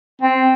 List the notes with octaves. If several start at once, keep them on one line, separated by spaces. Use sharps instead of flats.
C4